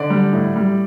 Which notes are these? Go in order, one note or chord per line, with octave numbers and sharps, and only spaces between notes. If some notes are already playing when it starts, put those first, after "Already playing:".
Already playing: D3 D5
G3
A2
G3